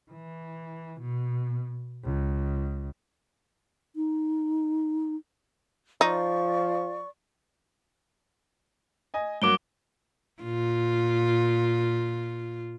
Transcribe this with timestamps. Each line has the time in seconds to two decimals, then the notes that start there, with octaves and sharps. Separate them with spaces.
0.11 E3
1.00 B2
2.05 C#2
3.96 D#4
6.01 F3 D#4 D5 C#6
9.14 D#5 G#5
9.42 G2 F#3 A#3 D6 D7 G7
10.42 A#2 F4